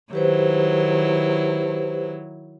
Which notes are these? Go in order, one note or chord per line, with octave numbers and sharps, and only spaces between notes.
D#3 F#3 E4 G4 B4 C5